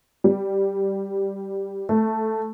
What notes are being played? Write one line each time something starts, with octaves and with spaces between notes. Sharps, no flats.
G3
A3